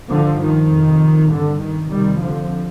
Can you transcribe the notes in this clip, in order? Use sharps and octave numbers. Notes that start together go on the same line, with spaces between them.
G2 D3 F3
D#3
F2 C3
G2 D3
D#3
F2 C3 D#3 G3
D3 F3